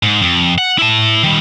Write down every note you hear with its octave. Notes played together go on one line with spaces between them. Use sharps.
G#2
F2
F#5
E4 A5
D#3 G3